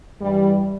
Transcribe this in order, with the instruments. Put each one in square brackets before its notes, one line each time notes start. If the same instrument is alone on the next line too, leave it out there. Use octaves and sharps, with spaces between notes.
[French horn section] G2 E3 G3